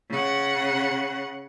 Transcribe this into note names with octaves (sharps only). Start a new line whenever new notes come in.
C#3 F#5